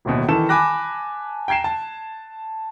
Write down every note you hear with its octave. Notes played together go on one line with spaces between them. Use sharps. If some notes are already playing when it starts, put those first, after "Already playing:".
D1 G1 D#2 B2
D#3 E3 A4 E7
G#5 A5 B5 D6 F#6 A#6
G5 A#5 G#6 C7 E7
A5